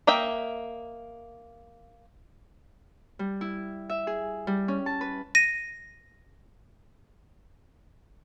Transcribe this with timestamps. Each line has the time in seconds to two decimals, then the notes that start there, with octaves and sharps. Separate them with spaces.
0.07 A#3 D#5 E5 G5
3.19 G3
3.41 E4
3.89 E5
4.07 G#4
4.47 G3
4.68 C#4
4.86 A5
5.01 B4
5.35 A#6 D#7